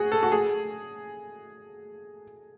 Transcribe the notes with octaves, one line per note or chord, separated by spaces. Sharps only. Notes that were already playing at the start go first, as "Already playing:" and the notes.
Already playing: F#4 G#4
A4
F#4
G#4